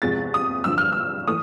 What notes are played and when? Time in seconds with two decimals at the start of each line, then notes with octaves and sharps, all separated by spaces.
0.02 E2 C3 F3 G#3 A6
0.34 D#6
0.64 G2 D3 F3 E6
0.78 F6
0.92 E6
1.27 E3 A3 D#6